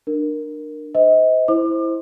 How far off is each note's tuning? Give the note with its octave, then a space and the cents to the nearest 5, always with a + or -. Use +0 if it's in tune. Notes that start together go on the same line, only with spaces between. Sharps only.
D4 +30 A#4 +0
C5 -30 D#5 +35
E4 +0 C5 +0 D6 +35